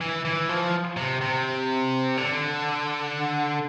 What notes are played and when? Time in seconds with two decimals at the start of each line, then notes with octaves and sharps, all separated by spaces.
0.01 E3
0.25 E3
0.49 F3
0.97 C3
1.21 C3
2.17 D3